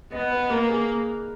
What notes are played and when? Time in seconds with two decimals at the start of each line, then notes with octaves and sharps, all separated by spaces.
0.12 B3 D#5
0.31 B4
0.50 A#3 A#4
0.69 G#4